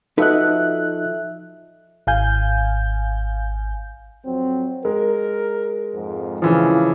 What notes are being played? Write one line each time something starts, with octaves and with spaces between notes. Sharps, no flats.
F3 D#4 F#4 A4 B4 D#5 E5 F#6
G#1 F5 G#5 G6
F2 F#3 C4
G#3 A#4
F2 G#2
C#3 E3 F3